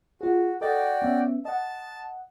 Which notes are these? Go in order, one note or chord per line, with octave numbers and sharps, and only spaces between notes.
F4 F#4 G#4
F#4 A4 D5 D#5 G5 A6
B3 C#4 E5
D#5 F#5 A5